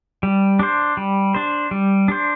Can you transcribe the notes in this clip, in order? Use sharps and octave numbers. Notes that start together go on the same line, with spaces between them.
G3
D4 C5
G3
D4 C5
G3
D4 C5